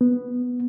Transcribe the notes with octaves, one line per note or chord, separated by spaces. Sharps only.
B3